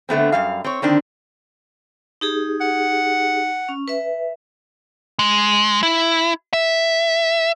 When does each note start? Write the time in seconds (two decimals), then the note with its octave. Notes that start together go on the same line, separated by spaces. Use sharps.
0.09 D3 A3 B3 C4
0.32 F#2 G3 F5
0.64 C4 C#5
0.82 D3 D#3 C4 D4
2.21 D#4 G4 G#4
2.61 F#5
3.69 C#4
3.88 B4 E5
5.19 G#3
5.83 E4
6.53 E5